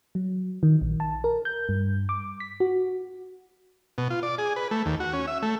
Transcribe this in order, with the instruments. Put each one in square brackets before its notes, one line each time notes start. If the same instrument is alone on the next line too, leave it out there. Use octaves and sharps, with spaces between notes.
[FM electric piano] F#3
D#3
A#1
A5
A#4
G6
G2
D6
B6
F#4
[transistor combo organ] B2
F4
D5
G#4
B4
A3
D#2
F#4
C#4
E5
A3